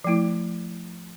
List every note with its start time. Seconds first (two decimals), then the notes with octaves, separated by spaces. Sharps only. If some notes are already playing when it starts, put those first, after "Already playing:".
0.04 F3 A3 E4